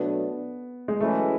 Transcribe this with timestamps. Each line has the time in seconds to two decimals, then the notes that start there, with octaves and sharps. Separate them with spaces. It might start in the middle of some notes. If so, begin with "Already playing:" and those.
Already playing: B2 F#3 A3 B3 D4
0.88 G#3
1.00 F#2 C#3 E3 G#3 A3 C#4